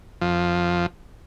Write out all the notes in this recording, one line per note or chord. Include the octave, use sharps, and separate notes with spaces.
F2 F3